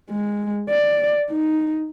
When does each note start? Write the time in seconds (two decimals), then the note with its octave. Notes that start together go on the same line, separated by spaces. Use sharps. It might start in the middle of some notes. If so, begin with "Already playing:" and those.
0.11 G#3
0.70 D5
1.31 D#4